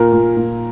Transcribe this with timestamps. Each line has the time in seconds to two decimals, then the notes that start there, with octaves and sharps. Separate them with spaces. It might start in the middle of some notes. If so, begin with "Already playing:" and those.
Already playing: A#2 A#4
0.13 A#2
0.37 A#2